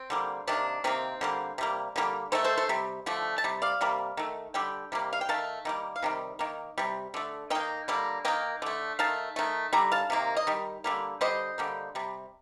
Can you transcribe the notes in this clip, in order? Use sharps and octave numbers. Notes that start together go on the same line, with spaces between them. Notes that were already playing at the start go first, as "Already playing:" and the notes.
Already playing: C4
D3 G3 A#3
C3 D#3 A#3 D4
C3 D#3 A#3 C4
D3 G3 A#3
C3 G3 A#3
D3 G3 A#3
D#3 A3 A4 C5
A4 C5
A4 C5
C3 G3
D3 F3 A3
A5
C3 G3
D5 F5
C3 G3 A#3
D#3 A3
D3 G3 G5
C3 G3 A#3
F5
G5
D#3 A3 F5 A5
D#3 G3 A#3
F5
C3 D#3 G3
D#3 A#3
C3 G3
D3 A3
D#3 A#3 D#5 G5
D3 G3 A#3
D#3 A#3 D#5 G5
D3 A3
D#3 A3 F5 A5
D#3 A3
D3 G3 A#5
F5 A5
C3 D#3 A#3
D#5
D#3 G3
D3 G3 A#3
D3 G3 C5 D#5
D3 G3 A#3
C3 G3